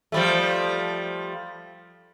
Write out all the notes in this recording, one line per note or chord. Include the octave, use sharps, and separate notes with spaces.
F3 G3 A3